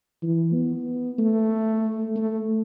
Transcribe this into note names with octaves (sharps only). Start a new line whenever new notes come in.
E3
B3
A3
A3